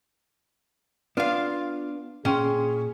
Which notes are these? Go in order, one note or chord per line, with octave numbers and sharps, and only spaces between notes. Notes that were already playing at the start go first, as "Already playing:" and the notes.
B3 D4 F4 F5
A#2 C#4 G#4 G5 C6